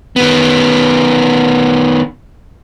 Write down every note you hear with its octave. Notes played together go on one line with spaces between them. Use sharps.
D#3 B3